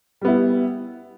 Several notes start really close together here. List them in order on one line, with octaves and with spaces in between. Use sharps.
G3 B3 E4